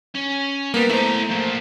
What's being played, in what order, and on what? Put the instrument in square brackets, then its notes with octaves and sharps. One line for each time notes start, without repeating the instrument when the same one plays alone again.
[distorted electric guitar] C#4
[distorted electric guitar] G3 [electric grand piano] A#3 B3
[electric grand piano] A3 C5 [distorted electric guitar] E4 A#5
[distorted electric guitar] F3 A#3